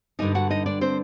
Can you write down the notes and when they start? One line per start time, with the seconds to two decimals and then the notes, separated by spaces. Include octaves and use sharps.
0.19 G2 D3 G3 D4 D#4 D#5
0.35 F#4 F#5
0.50 D#4 D#5
0.66 D4 D5
0.81 C4 C5